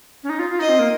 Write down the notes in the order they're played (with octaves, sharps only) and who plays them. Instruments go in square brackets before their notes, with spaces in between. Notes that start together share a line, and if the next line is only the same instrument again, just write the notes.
[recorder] C#4
D#4
F4
F4
[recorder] D#4 [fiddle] D#5
[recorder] C4
A#3